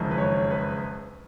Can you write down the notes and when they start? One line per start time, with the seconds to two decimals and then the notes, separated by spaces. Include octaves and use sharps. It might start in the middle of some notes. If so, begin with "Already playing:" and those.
Already playing: F#1 F2 D#3 G#3
0.11 B4
0.18 C#5
0.51 B4